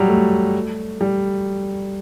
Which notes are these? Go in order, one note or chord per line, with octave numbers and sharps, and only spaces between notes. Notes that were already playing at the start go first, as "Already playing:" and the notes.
Already playing: F#3 G3
A3
G3